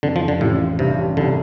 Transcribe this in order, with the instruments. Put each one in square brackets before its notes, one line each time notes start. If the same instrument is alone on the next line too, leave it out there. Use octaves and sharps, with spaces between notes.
[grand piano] F2 [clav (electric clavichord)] D3
[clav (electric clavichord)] F3
[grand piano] F2
[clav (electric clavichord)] D3
[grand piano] A1 [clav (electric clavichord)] A2
[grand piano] F4
[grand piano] G2 [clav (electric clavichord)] C3
[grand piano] A1
[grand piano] C2 [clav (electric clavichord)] D3